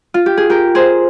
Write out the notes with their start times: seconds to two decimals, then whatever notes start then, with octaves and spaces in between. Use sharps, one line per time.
0.14 F4
0.26 G4
0.37 G#4
0.50 G4 A#4
0.75 G#4 C5